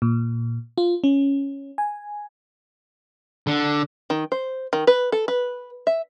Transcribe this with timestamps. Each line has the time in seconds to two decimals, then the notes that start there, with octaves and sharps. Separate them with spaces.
0.02 A#2
0.78 F4
1.04 C#4
1.78 G#5
3.47 D3
4.10 D#3
4.32 C5
4.73 D#3
4.87 B4
5.12 A4
5.28 B4
5.87 E5